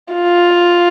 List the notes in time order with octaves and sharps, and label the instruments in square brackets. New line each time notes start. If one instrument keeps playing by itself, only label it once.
[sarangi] F4